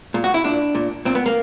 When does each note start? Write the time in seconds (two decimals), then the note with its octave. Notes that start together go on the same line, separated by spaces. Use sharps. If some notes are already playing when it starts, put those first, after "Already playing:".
0.14 A#2
0.24 F#4
0.34 E4
0.44 A#2 D4
0.75 A#2
1.05 A#2 C4
1.15 B3
1.26 A#3